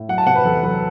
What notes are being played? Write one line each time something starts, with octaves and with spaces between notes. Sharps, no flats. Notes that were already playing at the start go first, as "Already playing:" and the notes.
Already playing: A2
F#3 F#5
A5
C3 F#5
B4
E2 A4
F#3 B4